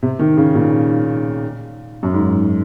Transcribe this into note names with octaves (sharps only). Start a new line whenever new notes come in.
C3
D#3
C#3
A#2
F#2
G#2